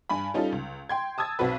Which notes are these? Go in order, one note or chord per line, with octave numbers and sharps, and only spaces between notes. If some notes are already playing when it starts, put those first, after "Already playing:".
G2 G#5 B5
G3 C#4 D#4 F4 A4
C#2
G5 C6 G#6
A5 D#6 E6 G#6 A6
B1 C4 F#4 B4